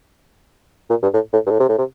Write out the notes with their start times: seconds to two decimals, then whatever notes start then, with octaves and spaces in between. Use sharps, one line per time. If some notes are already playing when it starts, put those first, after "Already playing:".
0.90 A#2
1.02 G2
1.14 A2
1.33 A2
1.46 G2
1.50 A2
1.60 C3
1.69 A2
1.78 C3